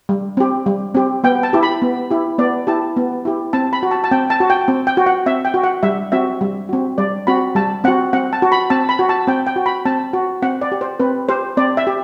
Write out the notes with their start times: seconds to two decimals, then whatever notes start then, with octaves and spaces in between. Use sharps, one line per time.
0.09 G3
0.37 C4 G4
0.66 G3
0.94 C4 G4
1.24 B3 G5
1.43 A5
1.53 E4 G4
1.63 B5
1.82 B3
2.11 E4 G4
2.38 B3 D5
2.67 E4 G4 A5
2.97 B3
3.25 E4 G4
3.53 C4 A5
3.73 B5
3.83 F#4
3.91 A5
4.04 A5
4.11 C4 G5
4.30 A5
4.40 F#4
4.50 G5
4.68 C4
4.87 G5
4.97 F#4
5.06 F#5
5.26 C4 E5
5.45 G5
5.54 F#4
5.63 F#5
5.83 G3 E5
6.12 C4 F#4 E5
6.41 G3
6.69 C4 F#4
6.98 G3 D5
7.27 C4 F#4 B5
7.55 G3 A5
7.84 C4 F#4 F#5
8.13 C4 F#5
8.33 A5
8.42 F#4
8.52 B5
8.70 C4 A5
8.89 B5
8.99 F#4
9.09 A5
9.27 C4 G5
9.47 G5
9.56 F#4
9.66 B5
9.86 C4 A5
10.13 F#4
10.42 C4 F#5
10.61 D5
10.72 G4
10.81 C5
11.00 C4 B4
11.29 G4 C5
11.57 C4 D5
11.77 E5
11.87 G4